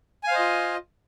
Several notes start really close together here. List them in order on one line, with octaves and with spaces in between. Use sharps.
G#5 F5 C5 D#5 F4